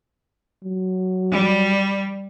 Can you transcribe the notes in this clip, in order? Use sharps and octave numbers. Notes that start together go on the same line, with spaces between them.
F#3
G3